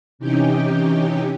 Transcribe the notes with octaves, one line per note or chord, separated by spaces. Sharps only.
C3 E3 C#4 D#4 G4 G5